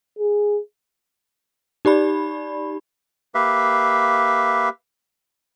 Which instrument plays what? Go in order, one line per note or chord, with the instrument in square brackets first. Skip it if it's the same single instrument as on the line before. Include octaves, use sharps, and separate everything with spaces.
[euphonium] G#4
[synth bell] D#4 G4 D5 B5
[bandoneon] A#3 G4 B4 E5 F5